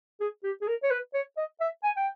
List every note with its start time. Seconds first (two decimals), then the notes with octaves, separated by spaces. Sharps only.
0.20 G#4
0.44 G4
0.62 G#4
0.67 A#4
0.83 C#5
0.91 B4
1.14 C#5
1.37 D#5
1.60 E5
1.84 G#5
1.97 G5